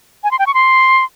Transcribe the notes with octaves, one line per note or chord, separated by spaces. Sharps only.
G#5
C6
G5
C#6
C6